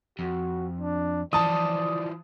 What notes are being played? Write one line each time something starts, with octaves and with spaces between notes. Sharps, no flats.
F2 F#4
D4
E3 F3 D5 A5 D#6